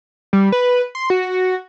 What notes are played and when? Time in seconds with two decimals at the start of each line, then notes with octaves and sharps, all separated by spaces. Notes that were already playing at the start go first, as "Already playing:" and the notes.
0.33 G3
0.52 B4
0.95 C6
1.10 F#4